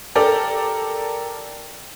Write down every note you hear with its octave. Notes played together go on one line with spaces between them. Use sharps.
G4 A4 A#4 D5